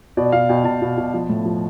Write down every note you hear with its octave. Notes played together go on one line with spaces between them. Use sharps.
B2 D5
B2 F5
B2 G5
B2 A5
B2
B2
F3
A2
F3